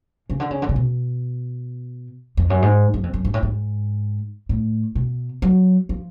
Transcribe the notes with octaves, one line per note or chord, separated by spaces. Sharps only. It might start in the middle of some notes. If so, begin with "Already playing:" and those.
C#3
D3
C#3
D3
C#3
B2
F2
F#2
G#2
F#2
F2
F#2
G#2
A2
G#2
A2
B2
F#3
F3